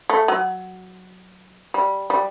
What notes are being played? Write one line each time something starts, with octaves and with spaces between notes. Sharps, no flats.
A3
F#3
G3
G3